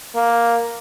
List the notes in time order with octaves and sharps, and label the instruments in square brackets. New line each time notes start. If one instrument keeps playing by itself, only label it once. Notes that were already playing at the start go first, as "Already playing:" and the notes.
[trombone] A#3